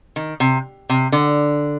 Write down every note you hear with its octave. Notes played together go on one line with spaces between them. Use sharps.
D#3
C3
C3
D3